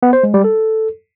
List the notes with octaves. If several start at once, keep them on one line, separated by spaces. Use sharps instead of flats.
B3
C5
G#3
G3
A4